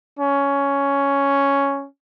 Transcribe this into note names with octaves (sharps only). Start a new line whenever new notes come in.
C#4